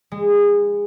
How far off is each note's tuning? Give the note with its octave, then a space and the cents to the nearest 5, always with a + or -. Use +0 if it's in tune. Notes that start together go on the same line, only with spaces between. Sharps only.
G#3 -25